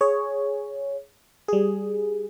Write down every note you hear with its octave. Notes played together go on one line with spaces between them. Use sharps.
G#4 C#5
G3 G#4